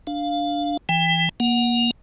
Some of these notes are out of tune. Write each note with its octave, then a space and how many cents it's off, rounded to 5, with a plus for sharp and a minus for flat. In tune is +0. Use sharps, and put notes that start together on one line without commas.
D4 +0 F5 +0
E3 +20 G5 +35
A#3 +25 F#5 +0